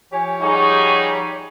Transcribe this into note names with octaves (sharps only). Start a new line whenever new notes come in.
F3 G4 C#5 G#5
G3 D#4 G#4 F#5 C#6